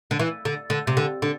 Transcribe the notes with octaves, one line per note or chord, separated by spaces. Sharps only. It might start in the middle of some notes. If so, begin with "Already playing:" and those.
D3
E3
D3
D3
C3
D3
D3